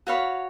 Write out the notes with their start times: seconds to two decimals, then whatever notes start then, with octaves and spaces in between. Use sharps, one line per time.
0.07 F#4 C#5 F5 B5